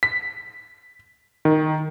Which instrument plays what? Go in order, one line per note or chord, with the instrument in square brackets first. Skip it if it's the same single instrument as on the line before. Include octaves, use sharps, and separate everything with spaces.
[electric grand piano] B6
D#3